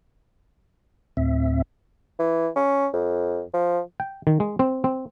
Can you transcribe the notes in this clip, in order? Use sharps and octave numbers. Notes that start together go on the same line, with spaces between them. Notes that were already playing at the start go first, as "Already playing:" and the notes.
D2 A2 C4 E5
E3
C#4
F2
F3
G5
D#3
G#3
C4
C4